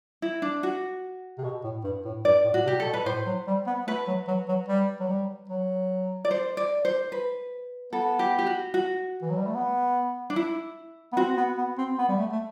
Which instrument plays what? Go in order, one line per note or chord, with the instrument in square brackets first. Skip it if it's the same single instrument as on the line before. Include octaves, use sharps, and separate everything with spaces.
[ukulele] E4
D4
F#4
[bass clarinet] C3
B2
A2
G2
A2
[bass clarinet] G2 [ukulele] D5
[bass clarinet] A2
[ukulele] F#4
[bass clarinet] C3 [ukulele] G4
[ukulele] A4
[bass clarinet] B2
[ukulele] B4
[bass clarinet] A2 [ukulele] C5
[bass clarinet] F#3
G3
B3
[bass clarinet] A3 [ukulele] B4
[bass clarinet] F#3
F#3
F#3
G3
F#3
G3
F#3
[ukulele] D5
C5
D5
C5
B4
[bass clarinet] B3 [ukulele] A4
[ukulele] G4
G4
F#4
F#4
[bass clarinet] E3
F#3
G3
A3
B3
[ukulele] D4
E4
[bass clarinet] B3
[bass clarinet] C4 [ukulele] F#4
[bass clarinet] B3
B3
C4
B3
G3
A3
A3